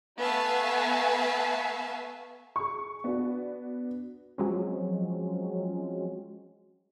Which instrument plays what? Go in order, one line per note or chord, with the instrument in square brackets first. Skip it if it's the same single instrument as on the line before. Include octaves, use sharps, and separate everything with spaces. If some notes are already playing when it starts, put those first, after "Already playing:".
[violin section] A3 B3 E5 F5 G#5 A5
[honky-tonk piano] G#4 C#6
B3 D4 F#4
[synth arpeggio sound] F3 F#3 G#3 C4 C#4